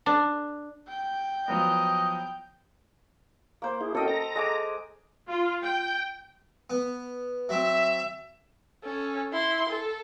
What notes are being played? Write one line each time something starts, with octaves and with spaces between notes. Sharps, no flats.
D4
G5
F3 F#3 B3 D#5
A#3 C5
E4 G#4
C#4 F#4 A4 A#4 D#5 G5
A#5 A#6
G#3 G#5 D6
F4
G5
B3
F#3 C4 E5
C#4 A4
E4 C6
A4